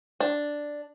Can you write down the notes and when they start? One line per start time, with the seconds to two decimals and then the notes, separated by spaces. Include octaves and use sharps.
0.20 D4